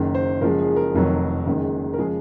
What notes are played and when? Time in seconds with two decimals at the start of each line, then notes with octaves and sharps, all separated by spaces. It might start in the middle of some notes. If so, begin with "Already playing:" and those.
Already playing: F#1 F#2 D#3
0.15 C5
0.41 F#1 F#2 F3 G#3 A#4
0.59 G#4
0.76 A#4
0.93 F1 F2 D#3 F#3
1.46 F#1 F#2 D#3 G#3
1.93 A#4
1.98 C#3 F3 G#3 G#4